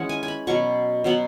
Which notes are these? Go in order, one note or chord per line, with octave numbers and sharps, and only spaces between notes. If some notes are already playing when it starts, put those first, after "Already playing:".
Already playing: E3 G#3 C#4 F#5
G#5
G#5
B5
B2 F#3 C#4 C#6
B2 F#3 B3